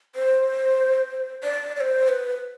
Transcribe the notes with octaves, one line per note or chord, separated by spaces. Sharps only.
C5
D5
D5
C5
B4